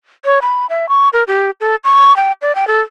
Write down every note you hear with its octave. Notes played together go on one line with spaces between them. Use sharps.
C#5
B5
E5
C#6
A#4
G4
A4
C#6
G5
D5
G5
A4